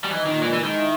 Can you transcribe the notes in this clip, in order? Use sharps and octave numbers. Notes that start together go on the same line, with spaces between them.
G3
E3 D#4
A#2 D#3
E3 G#3
E3
D#3 G#3
E4